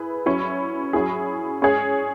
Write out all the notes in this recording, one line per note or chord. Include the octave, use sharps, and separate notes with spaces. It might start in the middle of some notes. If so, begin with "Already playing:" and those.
Already playing: E4 G#4 B4
F#3 C#4 E4
F#3 C#4 E4 G#4
G#3 C#4 G#4 C#5